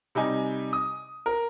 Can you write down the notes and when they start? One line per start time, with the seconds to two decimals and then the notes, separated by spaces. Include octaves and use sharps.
0.15 C3 G3 D#4 G#5
0.73 D#6
1.26 A#4